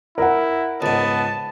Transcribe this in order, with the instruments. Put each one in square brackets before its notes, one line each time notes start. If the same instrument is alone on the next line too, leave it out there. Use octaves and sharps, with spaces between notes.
[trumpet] E4 [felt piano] A#4 F#5
[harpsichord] C#2 G#2 [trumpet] B3 [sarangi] A5